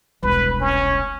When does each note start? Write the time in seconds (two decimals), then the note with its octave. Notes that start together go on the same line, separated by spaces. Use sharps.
0.23 E1 C2 B4
0.61 C#4